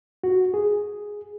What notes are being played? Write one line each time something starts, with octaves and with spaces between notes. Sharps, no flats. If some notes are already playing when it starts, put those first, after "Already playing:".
F#4
G#4